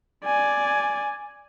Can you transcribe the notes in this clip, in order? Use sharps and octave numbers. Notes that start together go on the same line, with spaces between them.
D5 G#5